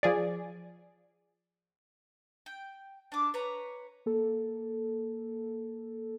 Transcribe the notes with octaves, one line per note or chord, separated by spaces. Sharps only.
F3 G#4 D5
G5
D4 D6
B4 C#5 A#5
A#3 A4